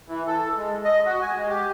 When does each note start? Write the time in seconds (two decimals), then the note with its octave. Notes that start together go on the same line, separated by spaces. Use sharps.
0.08 E3
0.27 A4
0.57 G#3
0.84 D#5
1.06 F#4
1.22 G#5
1.35 G#3
1.49 G4